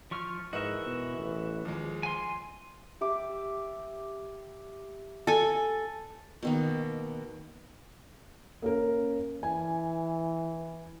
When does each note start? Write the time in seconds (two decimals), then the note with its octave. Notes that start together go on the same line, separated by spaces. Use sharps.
0.11 F3 C#6 F6
0.53 G#2 E3 F#4 A#4 D#5 E5
0.86 B2
1.18 A1
1.65 D#2 F3 G#3
2.03 G#5 C6
3.01 G4 E5 D6
5.27 A4 G#5
6.43 B2 D#3 A#3
8.62 A#3 C#4 A#4
9.43 E3 G#5